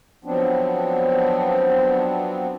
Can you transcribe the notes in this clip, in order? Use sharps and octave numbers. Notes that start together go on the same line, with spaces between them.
F3 F#3 B3 C4 D4